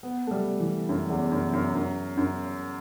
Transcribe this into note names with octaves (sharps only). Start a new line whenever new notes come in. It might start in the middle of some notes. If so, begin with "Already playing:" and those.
B3
A3
G3
E3
F#2
E2
F#2
F#2
F#2
F#2